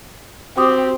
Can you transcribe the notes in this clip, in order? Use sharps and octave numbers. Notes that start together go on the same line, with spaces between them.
C4 F#4 G4 D6 D#6